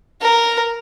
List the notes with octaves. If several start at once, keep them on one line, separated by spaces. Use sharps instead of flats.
A#4